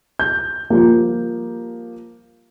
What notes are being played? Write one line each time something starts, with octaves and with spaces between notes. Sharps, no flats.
G6
F3 G3 A#3